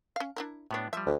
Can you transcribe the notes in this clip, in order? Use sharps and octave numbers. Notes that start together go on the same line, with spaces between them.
C#4 F5
D4 E4 A#4
A2 B3 D4 F#4 C#5
F3 G3 E5
D2